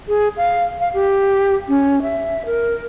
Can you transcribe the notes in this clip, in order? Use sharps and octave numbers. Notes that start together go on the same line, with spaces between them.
G#4
F5
F5
G4
C#4
E5
A#4